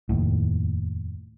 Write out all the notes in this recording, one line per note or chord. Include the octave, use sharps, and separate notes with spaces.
F1 D#2 A2